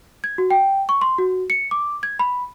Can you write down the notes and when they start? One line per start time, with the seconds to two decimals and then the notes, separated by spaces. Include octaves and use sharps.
0.24 G#6
0.38 F#4
0.50 G5
0.89 C#6
1.01 C6
1.18 F#4
1.50 C#7
1.71 D6
2.03 G#6
2.19 B5